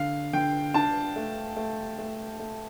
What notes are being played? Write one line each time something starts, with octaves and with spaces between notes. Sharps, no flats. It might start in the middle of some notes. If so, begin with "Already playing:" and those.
Already playing: D3 F5
D3 G5
D4 A5
A3
A3
A3
A3